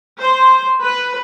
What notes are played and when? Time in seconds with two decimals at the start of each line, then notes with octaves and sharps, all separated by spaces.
0.19 C5
0.82 B4